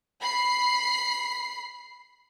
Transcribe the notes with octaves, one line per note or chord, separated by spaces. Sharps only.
B5 C7